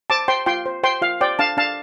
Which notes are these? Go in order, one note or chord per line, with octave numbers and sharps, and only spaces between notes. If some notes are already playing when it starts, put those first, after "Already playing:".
C5 A5 D6
C5 G5 C6
F4 G5 C6
C5
C5 G5 C6
F4 F5
C5 D5 G5
D4 F5 A5
D4 F5 A5